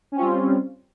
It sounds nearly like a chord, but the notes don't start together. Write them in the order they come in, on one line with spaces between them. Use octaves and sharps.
C#4 C4 F4 G3